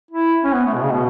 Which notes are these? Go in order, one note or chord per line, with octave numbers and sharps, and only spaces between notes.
E4
C#4
B3
A3
B2
C#3
B2